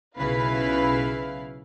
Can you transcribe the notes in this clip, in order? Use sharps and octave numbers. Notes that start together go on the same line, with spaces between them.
B1 C#3 E4 B4 F5